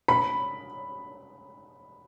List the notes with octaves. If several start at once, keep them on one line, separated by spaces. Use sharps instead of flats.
B5